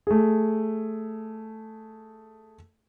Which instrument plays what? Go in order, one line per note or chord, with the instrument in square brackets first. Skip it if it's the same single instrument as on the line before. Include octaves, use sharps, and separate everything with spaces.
[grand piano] A3 G#4